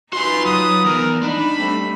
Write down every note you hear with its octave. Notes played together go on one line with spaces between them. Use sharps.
D#4 F4 F#4 B4 G#5 C6
F#3 D#6
E2 A#4
D4 D#4 B5
G3 A3 C4